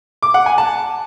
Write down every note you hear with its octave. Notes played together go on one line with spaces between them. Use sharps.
D6
F#5
G#5
A5